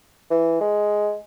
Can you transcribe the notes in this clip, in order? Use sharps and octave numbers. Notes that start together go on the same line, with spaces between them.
E3
G#3